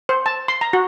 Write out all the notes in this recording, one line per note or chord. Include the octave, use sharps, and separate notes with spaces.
C5
A5
C6
A#5
F#4